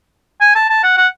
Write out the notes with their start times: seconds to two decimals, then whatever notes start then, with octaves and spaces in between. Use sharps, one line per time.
0.41 G#5
0.55 A5
0.69 A5
0.83 F#5
0.97 F#5